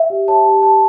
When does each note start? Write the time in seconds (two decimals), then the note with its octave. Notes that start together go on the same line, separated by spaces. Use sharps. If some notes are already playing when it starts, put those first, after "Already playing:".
Already playing: E5
0.10 G4
0.28 C#5 A5
0.45 G4
0.63 C#5 A5